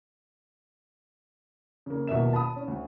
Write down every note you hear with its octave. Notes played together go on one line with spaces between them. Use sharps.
C#3 A#3
D#1 B2 A#3 E5 E7
A5 B5 D#6
C#4
D2